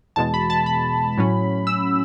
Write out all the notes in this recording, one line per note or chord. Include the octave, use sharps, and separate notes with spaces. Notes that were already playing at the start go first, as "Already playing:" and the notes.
E2 B2 G#3 A5
B5
A5
B5
A2 F#3 C#4
E6